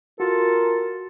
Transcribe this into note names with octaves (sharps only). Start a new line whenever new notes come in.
F4 F#4 A4 A#4